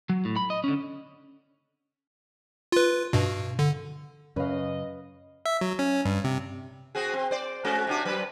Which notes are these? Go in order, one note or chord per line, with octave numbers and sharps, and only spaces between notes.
F#3
A2
B5
D#5
D3 C#4
F4 B4
G2 B2
D3
F#2 C#3 C#4 B4 D#5 F5
E5
F#3
C#4
G2
C3
C4 F#4 G#4
C4
C5 D5
G#3 C#4 F#4
C3 D4 F#4
F#3 B4